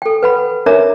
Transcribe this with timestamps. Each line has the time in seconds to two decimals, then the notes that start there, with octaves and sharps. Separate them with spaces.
0.02 A4 G5
0.23 B4 F#5 B5
0.66 D4 A#4 C#5 E5 A#5 D6